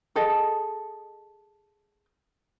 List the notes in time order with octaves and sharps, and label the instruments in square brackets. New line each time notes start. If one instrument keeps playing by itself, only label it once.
[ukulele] G#4 A4 D#5